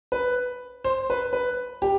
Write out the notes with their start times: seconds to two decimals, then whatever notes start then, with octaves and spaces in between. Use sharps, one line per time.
0.12 B4
0.84 C5
1.10 B4
1.33 B4
1.82 G4